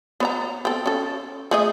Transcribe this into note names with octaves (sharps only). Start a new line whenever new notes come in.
B3 C#5 A#5
C4 A4
C#4 A4
A3 G#4 D#5